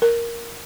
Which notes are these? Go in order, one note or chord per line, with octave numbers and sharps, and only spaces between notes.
A#4